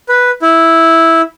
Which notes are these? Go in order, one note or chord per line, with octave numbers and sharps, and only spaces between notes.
B4
E4